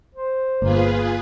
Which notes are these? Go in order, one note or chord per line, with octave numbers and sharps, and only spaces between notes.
C5
G1 A#3 F4 G#4 B4